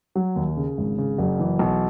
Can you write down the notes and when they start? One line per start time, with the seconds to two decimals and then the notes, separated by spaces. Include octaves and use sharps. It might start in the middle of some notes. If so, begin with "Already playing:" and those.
0.15 F#3
0.36 D#2
0.57 C#3
0.78 G#1
0.98 C#3
1.18 F#1
1.40 E3
1.59 B1